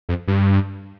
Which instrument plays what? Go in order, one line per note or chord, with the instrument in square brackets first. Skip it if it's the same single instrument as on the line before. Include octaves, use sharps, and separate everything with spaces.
[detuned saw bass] F2
G2